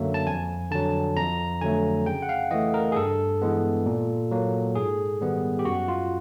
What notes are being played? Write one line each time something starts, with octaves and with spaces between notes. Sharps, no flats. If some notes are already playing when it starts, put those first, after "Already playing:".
Already playing: F#2 D3 F#3 A#3 E5
A5
F2 G#5
D3 F#3 A5
F2 A#5
D3 F#3 A3 G#5
C#3 G5
F#5
F5
E3 A3 D#5
A#4
G#4
G2 A4
E3 G#3 B3
A#2
F#3 A#3
G#2 G#4
D#3 G3 B3
G4
F#2 F#4
F4